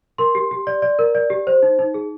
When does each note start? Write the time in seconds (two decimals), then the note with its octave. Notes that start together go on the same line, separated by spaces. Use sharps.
0.18 A#4 C6
0.35 G4
0.51 G4
0.67 D5
0.82 D5
0.99 A#4
1.15 D5
1.30 G4
1.47 C5
1.63 D#4
1.79 D#4
1.94 G#4